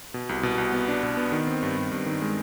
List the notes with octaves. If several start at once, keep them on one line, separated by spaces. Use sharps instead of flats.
B2
C2
B2
C2
B3
D4
B2
B3
D#3
C4
G2
G2
G2
D#3
G#3